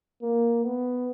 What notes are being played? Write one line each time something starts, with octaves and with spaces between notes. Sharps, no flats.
A#3
B3